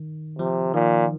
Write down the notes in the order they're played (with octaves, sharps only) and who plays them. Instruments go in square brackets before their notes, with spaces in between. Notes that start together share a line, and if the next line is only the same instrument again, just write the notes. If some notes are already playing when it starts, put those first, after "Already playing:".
Already playing: [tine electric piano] D#3
[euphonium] C3 [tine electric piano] F3
[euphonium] A#2 [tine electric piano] D#3